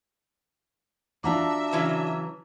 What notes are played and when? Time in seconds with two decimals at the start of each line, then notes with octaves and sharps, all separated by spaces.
1.24 D4 F4 F#4 E5 A5 A#5 D6
1.73 C#3 E3 F#3